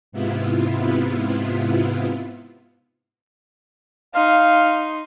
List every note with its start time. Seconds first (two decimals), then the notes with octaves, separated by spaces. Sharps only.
0.12 G#2 C3 B3 E4 F4
4.15 D#4 F5 C6